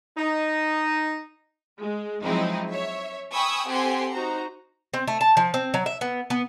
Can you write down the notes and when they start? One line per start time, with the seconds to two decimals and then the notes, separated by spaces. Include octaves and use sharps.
0.17 D#4
1.80 G#3
2.24 F3 F#3 G#3 C4 D#4 E4
2.69 C#5 E5
3.33 G5 G#5 B5 C#6 D#6 E6
3.67 C4 G4 A4 F#5 G#5 C6
4.12 D#4 F#4 C5 A#5
4.94 C4
5.07 A3
5.21 A5
5.37 F3
5.54 C4
5.74 F#3
5.86 E5
6.01 B3
6.30 B3